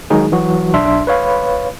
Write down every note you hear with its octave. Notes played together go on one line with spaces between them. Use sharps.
D#3 F#3 G#3 D#4 F#4 G#4
E3 F#3 F#4
B1 D4 E5 C6
B4 C#5 F5 B5